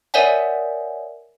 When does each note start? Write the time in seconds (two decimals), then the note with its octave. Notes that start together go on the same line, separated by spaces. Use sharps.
0.14 A#4 C#5 D5 E5 F#5 G#5